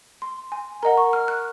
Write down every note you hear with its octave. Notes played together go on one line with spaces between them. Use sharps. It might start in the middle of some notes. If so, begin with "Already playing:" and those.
C6
G#5
A#4 D#5 F#5 A#5
C#6
F6
F#6